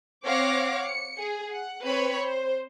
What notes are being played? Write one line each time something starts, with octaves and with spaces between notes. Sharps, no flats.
C4 C#5 F5 F#5 D6 A#6
C#7
G#4
F#5
C4 B4 C#5 B5
C5